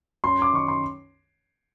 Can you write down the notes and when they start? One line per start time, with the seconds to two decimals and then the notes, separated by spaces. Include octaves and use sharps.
0.24 F#2 A#5 C6
0.42 D6
0.53 D#3 C#6
0.68 C6